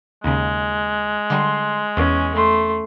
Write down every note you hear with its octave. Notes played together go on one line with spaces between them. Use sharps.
D#2 C#3 G#3
D3 G3 C6
E2 C#4
A3 C6